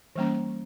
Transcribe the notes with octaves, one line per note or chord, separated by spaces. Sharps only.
E3 G3 A#3 C#4